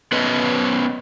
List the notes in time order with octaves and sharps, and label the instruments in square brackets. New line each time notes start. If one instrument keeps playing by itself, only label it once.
[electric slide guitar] B3 C#4 B4 C#5 D#5